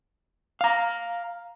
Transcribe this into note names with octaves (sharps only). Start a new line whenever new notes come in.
F5 A#5